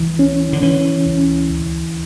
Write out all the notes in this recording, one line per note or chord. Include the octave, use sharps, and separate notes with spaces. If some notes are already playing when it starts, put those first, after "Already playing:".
Already playing: C#2 E3
C#4
D3
E3 C#4
C#2
D2